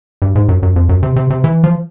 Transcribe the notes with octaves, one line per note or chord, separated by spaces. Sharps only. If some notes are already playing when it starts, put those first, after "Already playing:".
G2
G#2
F#2
F#2
F2
F#2
C3
C3
C3
E3
F3